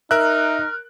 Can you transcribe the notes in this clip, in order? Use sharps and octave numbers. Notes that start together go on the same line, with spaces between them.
D#4 A#4 E5 F6 F#6